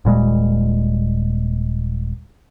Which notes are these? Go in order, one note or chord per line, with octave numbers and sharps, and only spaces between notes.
D#1 A#2 G3 G#3